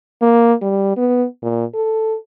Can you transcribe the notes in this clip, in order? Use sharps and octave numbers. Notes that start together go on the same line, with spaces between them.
A#3
G3
B3
A#2
A4